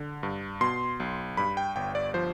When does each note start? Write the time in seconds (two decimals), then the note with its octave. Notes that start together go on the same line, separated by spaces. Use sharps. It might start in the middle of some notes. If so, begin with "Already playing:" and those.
Already playing: D3
0.23 G2
0.61 B2 C6
1.00 B1
1.37 G2 B5
1.57 G5
1.76 G1 G5
1.95 D5
2.14 F3 C5